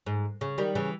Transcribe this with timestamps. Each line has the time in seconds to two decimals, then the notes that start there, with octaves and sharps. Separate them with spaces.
0.06 G#2
0.41 C#3
0.58 D#3 G3
0.75 C#3 E3